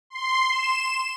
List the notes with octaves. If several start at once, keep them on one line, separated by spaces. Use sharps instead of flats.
C6
E7